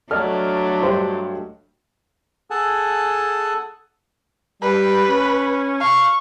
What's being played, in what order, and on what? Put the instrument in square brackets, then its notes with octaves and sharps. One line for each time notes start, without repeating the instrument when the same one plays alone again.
[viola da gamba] F#3 A3 D4 [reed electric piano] A4 D5 D#5 [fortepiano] F6
[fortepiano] G2 F#4 C5
[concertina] G#4 A4 F#5 G#5 A5
[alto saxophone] G3 [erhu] B4
[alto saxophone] C#4
[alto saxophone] F5 [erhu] C#6